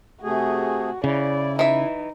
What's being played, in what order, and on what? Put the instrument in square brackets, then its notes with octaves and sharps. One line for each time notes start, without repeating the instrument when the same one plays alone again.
[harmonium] C3 A3 G#4 [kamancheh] F#4
[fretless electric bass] C#3 [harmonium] E4 [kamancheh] D5
[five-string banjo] E3 E5 [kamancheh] D#4